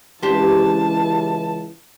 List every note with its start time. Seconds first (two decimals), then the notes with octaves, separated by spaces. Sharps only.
0.22 C#2 E3 C4 D4 G4 A5